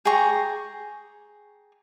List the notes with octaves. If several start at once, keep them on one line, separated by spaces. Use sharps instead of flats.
G#4 G5 A#5 C#6